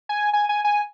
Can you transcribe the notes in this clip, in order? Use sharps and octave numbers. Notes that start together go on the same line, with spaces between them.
G#5
G#5
G#5
G#5